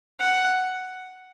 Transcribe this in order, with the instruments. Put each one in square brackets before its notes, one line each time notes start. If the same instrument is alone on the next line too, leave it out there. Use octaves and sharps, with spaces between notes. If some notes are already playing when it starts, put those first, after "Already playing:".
[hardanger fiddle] F#5